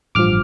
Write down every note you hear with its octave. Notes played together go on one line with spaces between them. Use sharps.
A1 G2 F3 D6 F6